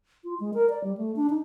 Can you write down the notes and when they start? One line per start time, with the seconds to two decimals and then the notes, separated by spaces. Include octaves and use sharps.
0.24 F4
0.40 G#3
0.54 A#4
0.70 D5
0.84 G3
0.97 A3
1.16 D4
1.30 D#4